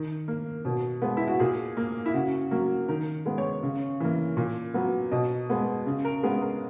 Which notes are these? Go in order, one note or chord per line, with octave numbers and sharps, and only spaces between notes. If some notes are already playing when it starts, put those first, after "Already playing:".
Already playing: D#3
A#3
B2
G#3 B3
E4
F#4
A#2 G#4
A#3
E4
C#3 F#4
F#3 A#3
D#3 A#4
G#3 B3
C#5
C#3
E3 A#3
A#2
F#3 B3
B2 D#5
G#3 B3
C#3
A#4
G#3 B3 G#4
A#4